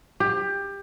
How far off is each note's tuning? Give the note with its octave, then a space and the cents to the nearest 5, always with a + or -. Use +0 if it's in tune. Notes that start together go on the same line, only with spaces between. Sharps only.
G4 +20